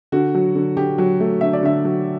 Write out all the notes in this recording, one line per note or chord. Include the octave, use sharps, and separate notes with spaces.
D3 F#4
F#3
D3
D3 G4
F#3
A3
D3 E5
D5
D3 E5
F#3